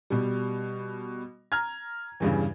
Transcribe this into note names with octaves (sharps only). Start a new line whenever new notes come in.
B2 G3
A#5 F6 G#6
E2 G2 C#3